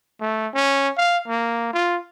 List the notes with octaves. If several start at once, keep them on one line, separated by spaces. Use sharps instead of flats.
A3
C#4
F5
A#3
F4